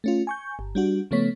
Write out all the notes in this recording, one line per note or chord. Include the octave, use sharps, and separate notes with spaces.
A3 C#4 F4
G#5 C#6 G6
G1
G3 D4 F#4
C#3 F3 A3 B3 C#5 B6